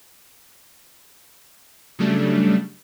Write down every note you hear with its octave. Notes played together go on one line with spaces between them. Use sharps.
C#3 F#3 G3 A3 D4